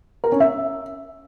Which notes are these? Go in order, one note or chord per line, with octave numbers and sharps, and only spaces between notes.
A#4
C#4
E5